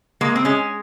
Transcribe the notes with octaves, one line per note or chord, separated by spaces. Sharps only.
G#3 A#3
C4
G#3 C#4